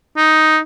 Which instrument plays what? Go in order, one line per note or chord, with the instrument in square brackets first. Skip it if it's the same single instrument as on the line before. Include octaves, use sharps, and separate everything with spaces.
[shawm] D#4